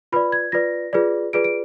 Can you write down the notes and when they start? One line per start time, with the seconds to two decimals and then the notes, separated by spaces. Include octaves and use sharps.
0.12 F4 B4 D5 B5
0.32 G#6
0.52 F4 B4 D5 A#6
0.93 F4 G#4 B4 D5
1.33 F4 G#4 B4 D5 D7
1.44 D7